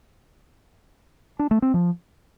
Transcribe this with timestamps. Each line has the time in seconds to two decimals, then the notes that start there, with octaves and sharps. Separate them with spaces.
1.39 D4
1.51 A3
1.62 C4
1.74 F3